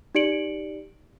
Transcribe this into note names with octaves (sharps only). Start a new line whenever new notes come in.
D#4 G4 D5 C#7 D7 F#7